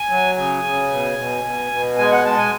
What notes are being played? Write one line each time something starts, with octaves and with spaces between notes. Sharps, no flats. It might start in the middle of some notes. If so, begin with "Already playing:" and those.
Already playing: G#5
F#3
C#3 G#5
C#3
B2
B2
B2
B2
G#3 G#5
F#5
G#3 A5
G#5